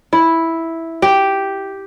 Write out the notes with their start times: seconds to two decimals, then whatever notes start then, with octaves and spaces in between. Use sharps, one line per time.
0.13 E4
1.02 G4